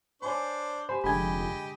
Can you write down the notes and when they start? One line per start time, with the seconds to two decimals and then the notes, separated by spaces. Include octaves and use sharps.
0.22 D4 C5 C#5 G#5 B5 D6
0.89 G4 C5 G#5 B5
1.04 F1 D3 G#3 G4 D#5 G#5 B5